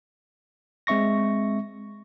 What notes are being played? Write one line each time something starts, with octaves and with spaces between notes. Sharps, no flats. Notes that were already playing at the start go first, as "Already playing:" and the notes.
G#3 C4 E5 C#6 A#6